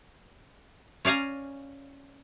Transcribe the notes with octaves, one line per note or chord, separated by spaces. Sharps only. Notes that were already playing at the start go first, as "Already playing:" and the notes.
C#4 D5 F5 G#5 A#5